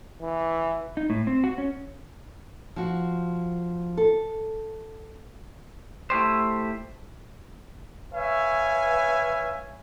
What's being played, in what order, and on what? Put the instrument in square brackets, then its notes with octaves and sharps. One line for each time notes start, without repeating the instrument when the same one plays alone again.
[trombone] E3
[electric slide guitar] D#4
A2
C4
F#4
C#4
[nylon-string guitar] F3 F#4
A4
[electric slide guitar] A3 E4 G4 C5
[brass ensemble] B4 C#5 E5 F5 G#5